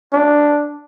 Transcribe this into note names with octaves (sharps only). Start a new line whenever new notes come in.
D4